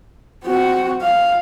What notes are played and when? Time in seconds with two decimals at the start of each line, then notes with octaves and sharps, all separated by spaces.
0.44 C4 F#4
1.01 F5